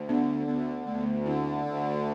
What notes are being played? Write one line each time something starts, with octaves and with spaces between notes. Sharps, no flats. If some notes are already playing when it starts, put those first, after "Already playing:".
Already playing: D2
D3 B3 D4
D2 B3
D2 A3
B3
A3
D3 C4 E4
D2